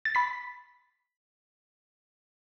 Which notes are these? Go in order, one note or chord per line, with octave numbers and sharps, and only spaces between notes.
A6
B5 B6